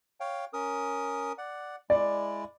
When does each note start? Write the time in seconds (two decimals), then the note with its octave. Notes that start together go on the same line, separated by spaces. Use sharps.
0.20 C#5 F5 G5
0.53 C#4 A#4 D#6
1.38 D5 F#5
1.90 G#3 E4 D5